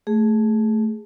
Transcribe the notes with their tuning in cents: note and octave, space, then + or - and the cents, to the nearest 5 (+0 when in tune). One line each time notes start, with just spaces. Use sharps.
A3 +0 G#4 +0